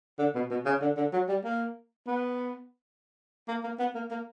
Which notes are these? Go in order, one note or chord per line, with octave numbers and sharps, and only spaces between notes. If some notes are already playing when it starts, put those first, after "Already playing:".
D3
B2
B2
C#3
D3
D3
F#3
G3
A#3
B3
A#3
A#3
B3
A#3
A#3